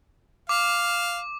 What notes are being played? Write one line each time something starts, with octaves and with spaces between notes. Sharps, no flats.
F5 D6